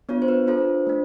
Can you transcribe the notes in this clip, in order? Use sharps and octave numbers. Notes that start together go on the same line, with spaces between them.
B3 D4 F4 C#5
C5
B4
D4 F4 A4 C5
A3 D4